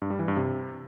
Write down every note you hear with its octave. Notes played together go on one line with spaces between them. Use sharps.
G2
G3
E3
G2
C3